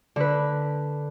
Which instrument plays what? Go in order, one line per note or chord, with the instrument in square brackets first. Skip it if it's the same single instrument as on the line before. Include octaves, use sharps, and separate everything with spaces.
[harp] D3 B4